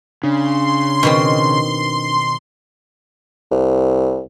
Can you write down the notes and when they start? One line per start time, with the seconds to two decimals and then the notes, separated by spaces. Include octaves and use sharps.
0.23 C#3 D4 C6
1.03 B2 D#3 C4
3.51 C2